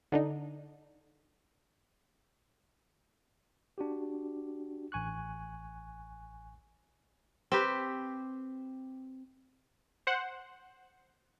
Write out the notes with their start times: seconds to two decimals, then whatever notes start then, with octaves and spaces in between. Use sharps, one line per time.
0.12 D3 D4 D#4
3.78 D4 F#4 G4
4.92 A1 G#5 C#6 F#6
7.52 C4 G4 B4
10.07 C5 F#5